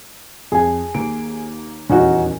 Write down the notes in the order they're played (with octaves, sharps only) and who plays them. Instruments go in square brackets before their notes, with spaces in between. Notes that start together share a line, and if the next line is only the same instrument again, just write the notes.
[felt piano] F2 [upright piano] G#4 G#5
[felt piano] D#2 A#3 D7
[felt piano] D#1 E2 [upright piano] C#4 D#4 F#4